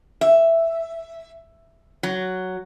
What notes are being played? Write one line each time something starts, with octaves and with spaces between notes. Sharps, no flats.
E5
F#3